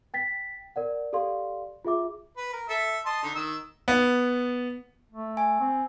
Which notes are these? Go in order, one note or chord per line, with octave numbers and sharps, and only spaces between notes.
G5 A6 B6
A#4 D5 F#5
G4 A4 D5 F5 C6
F4 G#4 E5 D6
B4
A#4
A4 E5
D#5 A5 C6
D3 D#4
D#3 E6
B3
A3
G#5
C4